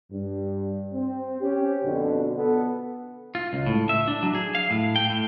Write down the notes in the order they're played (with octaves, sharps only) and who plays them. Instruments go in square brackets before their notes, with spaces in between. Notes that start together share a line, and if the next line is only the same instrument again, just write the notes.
[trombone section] G2
C4
C#4 G4
F2 B2 D3
B3 A4
[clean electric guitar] F4
C#2
A2
E5
D4
F#3
G#4
F5
A2
G5
A2